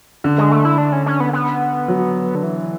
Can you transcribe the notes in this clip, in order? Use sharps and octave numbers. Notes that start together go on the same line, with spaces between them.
D3
G#3
A3
E4
D4
C#4
C#4
B3
B3
F#3
D3
E3